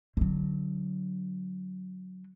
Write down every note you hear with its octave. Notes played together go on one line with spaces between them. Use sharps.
D3 F#3